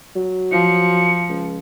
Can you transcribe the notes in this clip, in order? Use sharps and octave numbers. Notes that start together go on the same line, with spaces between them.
F#3
F3 C#7
C#2